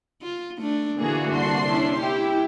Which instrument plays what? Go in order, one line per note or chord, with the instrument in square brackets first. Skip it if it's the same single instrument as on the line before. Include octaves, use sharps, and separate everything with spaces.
[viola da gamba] F4
A3 D4
[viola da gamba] A#2 [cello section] D3 E3 F#4 [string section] A#3 G#4
[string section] C2 D4 C6
[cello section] C#4 E4
[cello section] E4 [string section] G4